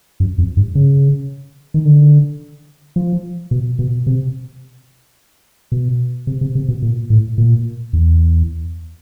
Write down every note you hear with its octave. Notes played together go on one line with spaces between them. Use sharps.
F#2
F2
G2
C#3
D#3
D3
F3
B2
B2
C3
B2
C3
C3
C3
B2
A#2
A2
A#2
E2